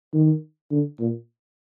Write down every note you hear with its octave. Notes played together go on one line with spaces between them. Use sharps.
D#3
D3
A#2